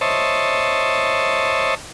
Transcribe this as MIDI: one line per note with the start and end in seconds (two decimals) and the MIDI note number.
0.01 1.75 72
0.01 1.75 73
0.01 1.75 75
0.01 1.75 76
0.01 1.75 81